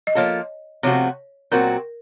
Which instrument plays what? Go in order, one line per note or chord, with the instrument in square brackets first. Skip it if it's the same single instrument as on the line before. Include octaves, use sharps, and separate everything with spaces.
[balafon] D#5
[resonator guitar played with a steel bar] F3 A#3 F4 A4 [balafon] C#5
[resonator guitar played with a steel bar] C3 F3 A3 C4 F#4 [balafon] C#5
[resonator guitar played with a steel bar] A#2 F#3 C4 F#4 [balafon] A#4